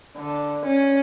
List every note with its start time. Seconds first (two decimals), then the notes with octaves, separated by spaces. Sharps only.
0.18 D3
0.66 C#4